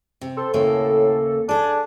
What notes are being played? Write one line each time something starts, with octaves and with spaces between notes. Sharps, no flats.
C3
A4 C5
D#2 A2 C#3 A#3
D4 G#4 A4